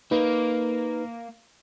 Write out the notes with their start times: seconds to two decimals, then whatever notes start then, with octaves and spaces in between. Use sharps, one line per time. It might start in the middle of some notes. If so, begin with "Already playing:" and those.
0.11 A#3 D#4 B4